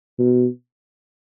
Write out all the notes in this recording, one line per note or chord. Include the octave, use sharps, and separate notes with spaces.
B2